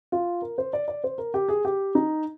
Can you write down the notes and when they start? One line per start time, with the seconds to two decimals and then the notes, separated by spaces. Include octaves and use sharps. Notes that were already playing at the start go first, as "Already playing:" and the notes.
0.12 F4
0.42 A#4
0.58 C5
0.73 D5
0.88 D5
1.04 C5
1.18 A#4
1.34 G4
1.48 G#4
1.65 G4
1.95 D#4